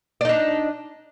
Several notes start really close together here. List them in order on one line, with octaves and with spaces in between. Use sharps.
D5 D#4 D4